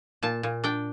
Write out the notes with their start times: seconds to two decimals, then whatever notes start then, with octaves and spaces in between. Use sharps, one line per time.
0.23 A#2 A5
0.43 A#2
0.64 D4 G5